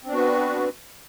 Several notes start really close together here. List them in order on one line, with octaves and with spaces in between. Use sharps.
C4 D4 B3 F#4 B4